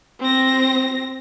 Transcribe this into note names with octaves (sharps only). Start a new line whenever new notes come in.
C4 A#6